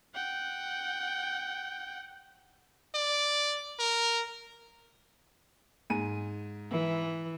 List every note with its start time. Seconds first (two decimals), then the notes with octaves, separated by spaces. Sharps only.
0.14 F#5 G5
2.95 D5
3.79 A#4
5.90 G#2 G#5 D#7
6.70 E3